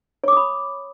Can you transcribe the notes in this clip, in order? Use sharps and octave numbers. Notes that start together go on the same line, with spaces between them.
C#5 B5 D6 D#6